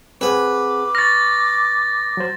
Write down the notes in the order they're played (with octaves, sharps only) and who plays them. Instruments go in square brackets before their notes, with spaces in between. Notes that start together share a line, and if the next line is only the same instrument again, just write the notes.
[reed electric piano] C4 G#4 F#5 [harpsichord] B4 [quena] D6
[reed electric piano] C#6 F6 [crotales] A6 A#6
[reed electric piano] F#3 C5